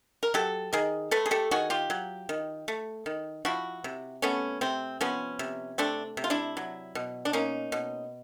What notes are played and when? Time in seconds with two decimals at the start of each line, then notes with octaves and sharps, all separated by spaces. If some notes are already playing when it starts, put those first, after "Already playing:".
0.23 A#4
0.34 F#3 G4 A4
0.73 D#3 G#4 A#4
1.11 A3 A4 B4
1.26 G#4
1.31 G4 A4
1.51 D#3 F#4 G#4
1.70 F4 G4
1.90 F#3
2.29 D#3
2.68 A3
3.06 D#3
3.45 F3 E4 F#4
3.84 C3
4.22 A3 B3 C#4
4.61 C3 C4
5.01 F3 B3 C#4
5.39 C3
5.78 A3 C4 D4
6.17 C3
6.24 F4
6.30 D4 E4
6.57 F#3
6.95 B2
7.25 D4
7.33 A#3 C#4 D#4
7.72 B2